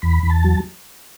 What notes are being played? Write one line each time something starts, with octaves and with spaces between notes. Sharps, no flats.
E2 B5
E2
A5
F#3